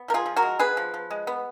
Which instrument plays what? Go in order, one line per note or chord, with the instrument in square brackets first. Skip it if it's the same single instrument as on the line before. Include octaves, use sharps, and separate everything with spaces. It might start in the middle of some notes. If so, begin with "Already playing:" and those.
Already playing: [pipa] B3
F3 A#4
F4 G#4
F3
F#4 A#4
G#3
B3 G#4 B4
F3
F3
G#3
B3